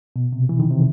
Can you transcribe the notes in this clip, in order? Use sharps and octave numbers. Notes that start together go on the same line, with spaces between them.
B2
C3
E3
D#3
C3